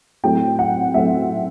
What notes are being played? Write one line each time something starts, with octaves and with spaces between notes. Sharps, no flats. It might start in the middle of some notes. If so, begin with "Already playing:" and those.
A2 F#3 A3 C4 G5
F#5
A2 F#3 A3 C4 E5